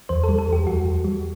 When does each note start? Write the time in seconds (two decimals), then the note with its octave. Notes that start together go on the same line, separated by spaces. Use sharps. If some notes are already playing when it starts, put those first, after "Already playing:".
0.09 E2 C5
0.24 A4
0.29 G3
0.39 A4
0.48 E2
0.53 G4
0.66 E2 F#4
0.85 E2
1.04 G3